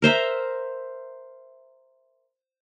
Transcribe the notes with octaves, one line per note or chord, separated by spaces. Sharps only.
A#4 C5 E5 A#5